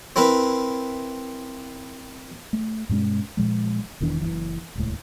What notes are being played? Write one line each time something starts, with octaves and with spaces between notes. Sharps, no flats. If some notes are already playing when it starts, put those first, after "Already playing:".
C4 E4 A#4 B4
A3
G2 B2 G#3 C#4
A#2 F3 G#3
E1 D#3 E3 D4
F#1 C#2 E3
D#1 C#2 A2